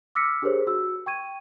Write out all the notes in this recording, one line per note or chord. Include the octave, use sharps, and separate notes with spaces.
D6 E6 F6 A#6 B6 C#7
D4 G4 G#4 A#4 C5 C#5
F#4 E6
G5 C#6 G#6 D#7